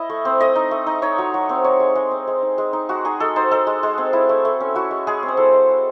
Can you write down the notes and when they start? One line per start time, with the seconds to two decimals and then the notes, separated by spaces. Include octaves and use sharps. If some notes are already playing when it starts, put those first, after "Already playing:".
Already playing: E4 D#5
0.10 A3
0.25 C4
0.40 A3 D#5
0.55 D#4
0.71 A3
0.87 D#4
1.02 D#4 C#5
1.18 F#3
1.34 F#3
1.49 C4
1.64 D#4 C#5
1.80 G#3
1.95 G#3
2.11 C4
2.27 G#3
2.43 D#4
2.58 G#3
2.73 D#4
2.89 G#3 F#4
3.05 D#4 G#4
3.20 G#3 A4
3.36 D#4 C5
3.51 D#4 A4
3.67 G#3
3.83 G#3
3.98 C4
4.13 E4
4.29 A3
4.45 A3
4.60 C#4
4.75 E4 F#4
4.91 G#3
5.07 G#3 G#4
5.23 C4
5.28 C5
5.37 E4 A4
5.53 G#3
5.69 G#3